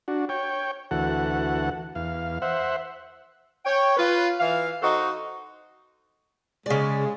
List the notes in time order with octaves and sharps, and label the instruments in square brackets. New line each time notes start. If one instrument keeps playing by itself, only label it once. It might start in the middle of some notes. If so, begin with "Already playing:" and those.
[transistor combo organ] D4 F#4
C#5 G5
D2 E3 F#4 A4 F#5
E2 F5
C5 E5 F#5
[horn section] C#5 G5
F4 B4
E3 F5
D#4 F#4 A4 C5
[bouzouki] C#3 D5 [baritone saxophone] G#3